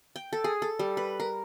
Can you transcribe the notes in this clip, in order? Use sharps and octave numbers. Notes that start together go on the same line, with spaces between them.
G5
A4
G#4
A4
G3
B4
A#4